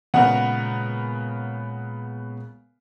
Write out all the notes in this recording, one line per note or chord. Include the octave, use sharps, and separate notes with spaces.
A#2 C#3 G#3 B3 A#4 F#5